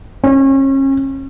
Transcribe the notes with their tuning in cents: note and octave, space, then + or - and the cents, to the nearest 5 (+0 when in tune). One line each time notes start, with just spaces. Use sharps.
C#4 -35